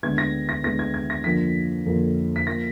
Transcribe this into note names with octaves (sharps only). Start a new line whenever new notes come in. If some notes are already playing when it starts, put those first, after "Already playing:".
D2 D3 G#3 B3 G#6
A#6
A#6
D2 D3 G#3 B3 A#6
G#6
G#6
A#6
F2 D3 F3 A#3 B6
F2 D3 F3 A#3
B6
F3 A#3 A#6